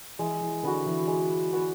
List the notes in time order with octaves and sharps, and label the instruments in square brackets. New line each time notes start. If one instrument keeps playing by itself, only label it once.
[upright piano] E3 [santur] G#3
[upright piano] E3
[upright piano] D3 [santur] B3 F#4
[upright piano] E3
[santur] G#3
B3 F#4